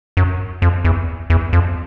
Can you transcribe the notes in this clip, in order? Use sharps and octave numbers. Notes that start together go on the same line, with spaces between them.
F#2
F2
E2
E2
F2